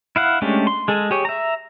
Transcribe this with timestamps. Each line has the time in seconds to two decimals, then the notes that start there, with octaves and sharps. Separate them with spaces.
0.16 E4 F5 F#5
0.42 G#3 A3 C#4 D4 G4
0.67 C6
0.88 G#3 G#4 A4
1.11 G4 G#4 C#5
1.25 E5 A#5